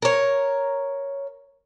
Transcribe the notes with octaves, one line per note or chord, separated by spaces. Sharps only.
A#4 C#5